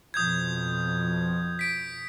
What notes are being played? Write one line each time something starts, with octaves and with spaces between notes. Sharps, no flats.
F2 B2 F3 D#6 G6 G#6
B6 D7